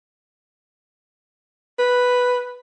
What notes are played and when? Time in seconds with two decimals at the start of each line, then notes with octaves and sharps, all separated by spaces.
1.78 B4